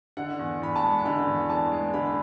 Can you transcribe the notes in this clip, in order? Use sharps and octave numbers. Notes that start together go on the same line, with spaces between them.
D3 F#5
E2
E2 B5
A5
G#3
D3 B5
E2
E2 A5
G#3
D3 B5